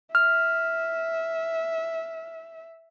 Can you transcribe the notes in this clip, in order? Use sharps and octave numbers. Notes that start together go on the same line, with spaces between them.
E5 F6